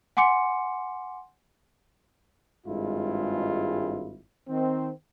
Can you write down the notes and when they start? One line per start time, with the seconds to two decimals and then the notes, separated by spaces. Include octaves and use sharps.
0.17 F#5 G#5 C6 D6 C#7
2.66 G#1 G2 G#3 E4 F4
4.49 D#3 C4